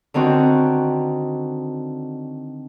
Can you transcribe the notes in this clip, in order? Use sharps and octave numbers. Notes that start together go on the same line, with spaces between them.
D3 D#3 C4 F#4